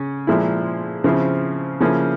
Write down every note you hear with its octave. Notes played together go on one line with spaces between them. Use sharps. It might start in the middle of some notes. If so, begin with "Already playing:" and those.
Already playing: C#3 C#4
A#2 F3 G#3 E4
C#3 F3 C4 E4
C#3 F3 A#3 C#4 E4